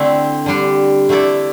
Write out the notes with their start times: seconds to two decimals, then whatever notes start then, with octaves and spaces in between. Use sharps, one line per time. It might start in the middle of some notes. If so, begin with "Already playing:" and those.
Already playing: D3 A3 C4 E4
0.46 D3 G3 D4
1.09 D3 A3 E4 A4 D5